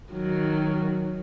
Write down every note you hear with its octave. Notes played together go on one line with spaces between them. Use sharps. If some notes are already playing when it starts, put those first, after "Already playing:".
D#3 F#3